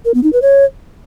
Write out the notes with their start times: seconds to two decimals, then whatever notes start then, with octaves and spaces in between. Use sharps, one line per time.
0.05 A#4
0.14 B3
0.24 D#4
0.33 B4
0.42 C#5